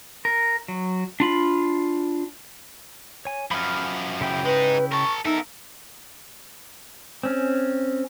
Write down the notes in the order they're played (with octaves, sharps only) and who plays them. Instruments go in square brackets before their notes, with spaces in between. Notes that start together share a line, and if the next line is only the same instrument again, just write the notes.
[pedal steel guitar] A#4
F#3
D4 F4 B5
C#5 G#5
[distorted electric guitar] F#2 F3 [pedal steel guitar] B5 F6
[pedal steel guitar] C#3 E4 G5
[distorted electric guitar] G#3 D#4 [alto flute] B4
[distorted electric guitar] A#4 A5 [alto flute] C#6
[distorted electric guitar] B3 E5 [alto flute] D#4 [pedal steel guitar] A4 A#4
[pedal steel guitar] C4 C#4